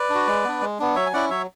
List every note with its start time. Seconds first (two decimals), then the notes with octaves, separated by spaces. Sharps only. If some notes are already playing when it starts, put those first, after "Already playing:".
Already playing: B4 D5
0.10 D4 F#4
0.28 G#3
0.45 B3 D4
0.61 G#3
0.79 B3 D4
0.95 F#3 C#5 E5
1.06 G#5
1.13 C#4 E4 D5 F#5
1.30 F#3 C#5 E5